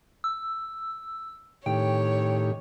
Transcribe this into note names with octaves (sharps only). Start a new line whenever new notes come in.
E6
A2 D#3 G4 C#5 G5